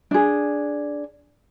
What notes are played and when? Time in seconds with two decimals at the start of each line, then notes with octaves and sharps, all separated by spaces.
0.11 D4 G#4